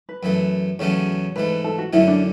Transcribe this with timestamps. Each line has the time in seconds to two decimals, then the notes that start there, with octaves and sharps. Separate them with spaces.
0.09 B4
0.23 F#2 E3 A3
0.79 E2 C#3 F#3 A3 C#4 C#5
1.36 G#2 E3 A3 B4
1.64 A4
1.78 F#4
1.93 F#2 D3 A3 C#4 E4
2.08 D4